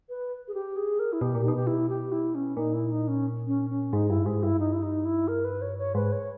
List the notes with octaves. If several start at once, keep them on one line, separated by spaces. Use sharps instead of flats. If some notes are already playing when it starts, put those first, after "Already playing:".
B4
G#4
G4
G#4
A#4
E4
B2 G4
A#2
B2 D#4
G4
E4
G4
E4
C#4
A#2 D#4
E4
D#4
C#4
C#4
C#4
G#2 D#4
G2 E4
G#2 G#4
G2 E4
D#4
E4
D#4
E4
A#4
B4
C#5
C#5
G#2 B4
C#5